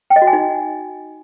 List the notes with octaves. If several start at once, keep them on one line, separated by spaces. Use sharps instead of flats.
G5
D#5
F#4
G#5
D#4